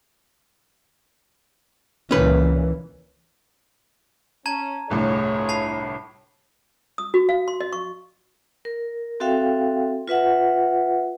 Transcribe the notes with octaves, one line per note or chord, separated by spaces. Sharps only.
C#2 A#2 E3 C#4 B4
C#4 A5 A#5 G#6
G1 C2 A2 F4 G#4 C#5
A5 B5 C7
D#6
F#4
F5
C6
D#5
C#6
A#4
C4 F#4 A4 E5 F5 G5
F4 B4 E5 F#5